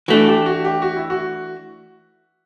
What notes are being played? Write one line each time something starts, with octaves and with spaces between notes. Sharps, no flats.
E3 A3 D4 F#4
G4
F#4
G4
F#4
E4
F#4